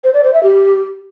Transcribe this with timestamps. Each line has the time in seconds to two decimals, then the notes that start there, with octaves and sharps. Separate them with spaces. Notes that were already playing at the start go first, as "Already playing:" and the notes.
0.04 C5
0.14 D5
0.24 C5
0.33 E5
0.43 G4